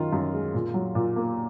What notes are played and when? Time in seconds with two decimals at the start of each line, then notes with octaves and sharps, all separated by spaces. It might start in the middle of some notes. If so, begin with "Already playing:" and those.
Already playing: F#2 D#3 F4
0.13 F#2
0.33 G#3
0.54 A#2
0.74 F#3
0.95 A#2
1.16 A#3